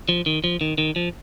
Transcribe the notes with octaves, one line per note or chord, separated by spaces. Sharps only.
F3
D#3
F3
D#3
D#3
F3